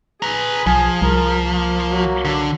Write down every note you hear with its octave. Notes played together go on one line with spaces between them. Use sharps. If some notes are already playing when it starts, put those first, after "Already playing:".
G#4 B4 A#5
B1 F3 G#5
C2 A#4
A#3
F#3
D3